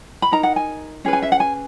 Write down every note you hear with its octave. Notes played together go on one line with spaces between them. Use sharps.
B5
D#4 A#4 A#5
F#5
G#5
C#4 G#4 B4
G#5
E5
F#5
G#5